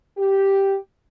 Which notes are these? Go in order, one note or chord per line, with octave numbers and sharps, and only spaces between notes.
G4